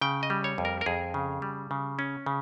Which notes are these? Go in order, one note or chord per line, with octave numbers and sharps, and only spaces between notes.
C#3 G5
D#5
G3
C#5
F2
A#4
A#4
F2 G#4
C#3
G3
C#3
C#4
C#3